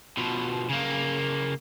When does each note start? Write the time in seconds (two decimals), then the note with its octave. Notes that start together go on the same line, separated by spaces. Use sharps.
0.17 B2 F3
0.69 C#3 A#3